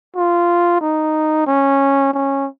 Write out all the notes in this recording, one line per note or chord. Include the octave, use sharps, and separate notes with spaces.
F4
D#4
C#4
C#4